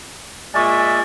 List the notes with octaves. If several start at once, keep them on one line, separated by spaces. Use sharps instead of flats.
A#2 G#3 D5 E5 G#5 C#6